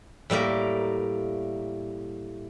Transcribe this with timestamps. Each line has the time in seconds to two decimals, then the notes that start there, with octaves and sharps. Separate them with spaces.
0.30 A2 G3 A#3 A#4